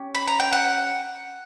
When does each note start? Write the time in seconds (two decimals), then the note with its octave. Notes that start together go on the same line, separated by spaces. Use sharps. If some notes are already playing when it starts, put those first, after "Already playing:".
Already playing: C#4 G4
0.15 B5
0.27 A#5
0.40 G5
0.53 F#5